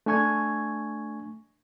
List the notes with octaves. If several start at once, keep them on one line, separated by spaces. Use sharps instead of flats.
A3 D4 G#5 C#6 G#6